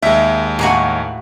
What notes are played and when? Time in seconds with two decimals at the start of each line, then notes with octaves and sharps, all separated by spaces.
0.02 D#2 G#3 E5
0.59 A2 A#3 F#4 G#5